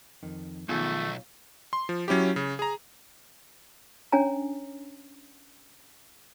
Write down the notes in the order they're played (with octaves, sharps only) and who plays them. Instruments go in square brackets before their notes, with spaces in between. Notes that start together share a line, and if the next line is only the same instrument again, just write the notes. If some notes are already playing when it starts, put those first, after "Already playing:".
[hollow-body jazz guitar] F2 D#3
[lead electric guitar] B1 [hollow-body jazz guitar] D#3 F3 G#4 [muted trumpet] A3 [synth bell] B3 F4 F5
[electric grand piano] C6
F3
F#3 C#4 E4 G4
C#3
G#4 A#5
[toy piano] C#4 D4 C#5 G#5 A#5